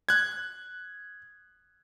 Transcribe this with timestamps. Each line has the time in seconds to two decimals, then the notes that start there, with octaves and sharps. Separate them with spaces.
0.09 F#6 G#6